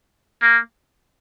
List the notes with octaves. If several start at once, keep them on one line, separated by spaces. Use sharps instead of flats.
A#3